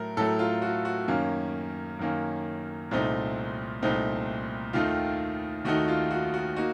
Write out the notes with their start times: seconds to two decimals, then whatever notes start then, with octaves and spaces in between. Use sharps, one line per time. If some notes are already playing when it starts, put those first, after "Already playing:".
Already playing: A2 F#3 A3 A#4
0.17 A2 F#3 A3 A4
0.39 F4
0.62 F#4
0.85 F#4
1.08 F#2 D#3 A#3 C#4
1.99 F#2 D#3 A#3 C#4
2.91 C2 A#2 A3 C4 D#4
3.82 C2 A#2 A3 C4 D#4
4.73 D#2 D#3 A3 D#4 F4
5.65 D#2 D#3 A3 D#4 F#4
5.88 F4
6.11 F#4
6.34 F#4
6.57 A#3 D#4 F#4